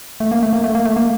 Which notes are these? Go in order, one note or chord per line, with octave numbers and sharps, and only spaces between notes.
A3
A#3
A3
A#3
A3
A#3
A3
A#3